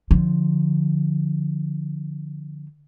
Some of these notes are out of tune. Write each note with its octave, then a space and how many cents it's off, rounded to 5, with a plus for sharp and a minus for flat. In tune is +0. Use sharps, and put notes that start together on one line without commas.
D3 +10 F3 +0